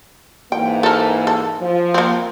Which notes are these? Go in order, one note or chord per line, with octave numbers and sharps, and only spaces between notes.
G#2 E3 A#3 G5
A4 A#4
A4
F3
A#3 C4